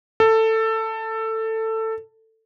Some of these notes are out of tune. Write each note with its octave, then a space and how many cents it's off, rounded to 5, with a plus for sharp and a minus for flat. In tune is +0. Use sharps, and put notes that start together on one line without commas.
A4 +15